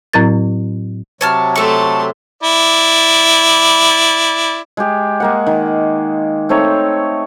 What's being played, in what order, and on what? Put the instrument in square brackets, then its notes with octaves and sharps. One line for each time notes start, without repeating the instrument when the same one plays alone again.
[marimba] A2 F#3 C4 E4 A#4 A6
[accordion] C3 F#3 [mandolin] C#5 A5 F6
[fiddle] A3 C6 [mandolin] A4 C#6
[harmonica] E4 D5
[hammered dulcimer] G#3 G4
G#3 A#3 F#5
D#3
A3 C4 D#4 C#5